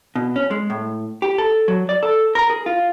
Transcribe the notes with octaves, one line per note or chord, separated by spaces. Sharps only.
B2
C#4
G#3
A2
G4
A4
F#3
D5
A4
A#4
G#4
F4